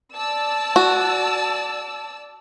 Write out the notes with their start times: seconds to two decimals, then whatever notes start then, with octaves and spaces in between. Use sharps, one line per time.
0.13 D5 A5 E6
0.76 F#4